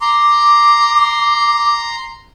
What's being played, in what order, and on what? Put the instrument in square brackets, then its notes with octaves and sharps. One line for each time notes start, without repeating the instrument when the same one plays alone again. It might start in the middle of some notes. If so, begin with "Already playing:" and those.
[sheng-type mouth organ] A#5 C6 [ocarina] D6